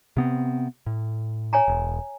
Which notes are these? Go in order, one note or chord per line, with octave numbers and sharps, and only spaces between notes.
C3 B3 C4
A2
C#5 G#5 A#5
E1